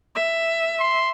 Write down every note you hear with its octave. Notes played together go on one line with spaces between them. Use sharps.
E5
C6